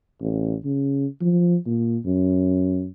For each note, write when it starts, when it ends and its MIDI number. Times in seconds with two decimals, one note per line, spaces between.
0.21 0.55 33
0.65 1.07 49
1.21 1.56 53
1.66 1.97 46
2.05 2.88 42